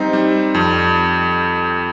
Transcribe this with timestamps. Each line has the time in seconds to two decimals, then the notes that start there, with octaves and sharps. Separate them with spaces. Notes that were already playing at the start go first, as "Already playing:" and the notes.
Already playing: G3 C4 D#4
0.13 G3
0.54 F2